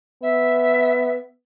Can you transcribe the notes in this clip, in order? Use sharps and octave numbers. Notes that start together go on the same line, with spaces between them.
B3 E5